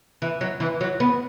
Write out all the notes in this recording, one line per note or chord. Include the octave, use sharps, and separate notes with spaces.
E3
F#3
E3
F#3
B3